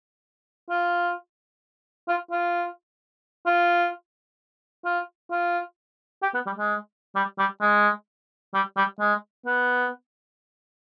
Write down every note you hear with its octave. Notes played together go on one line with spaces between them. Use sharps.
F4
F4
F4
F4
F4
F4
G4
B3
G3
G#3
G3
G3
G#3
G3
G3
G#3
B3